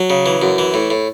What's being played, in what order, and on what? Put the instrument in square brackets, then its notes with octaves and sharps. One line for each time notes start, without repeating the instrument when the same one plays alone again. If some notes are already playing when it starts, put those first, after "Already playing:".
Already playing: [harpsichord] F#3
C#3
E3
F#2
E3
A2
A2